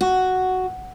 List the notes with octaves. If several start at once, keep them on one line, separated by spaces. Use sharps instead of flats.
F#4